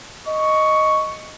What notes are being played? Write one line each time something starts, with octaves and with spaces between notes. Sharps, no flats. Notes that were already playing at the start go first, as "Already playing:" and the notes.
D#5 C#6